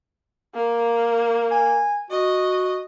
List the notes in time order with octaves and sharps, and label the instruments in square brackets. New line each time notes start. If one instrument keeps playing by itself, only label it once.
[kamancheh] A#3
[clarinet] G#5
[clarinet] F#4 [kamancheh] D#5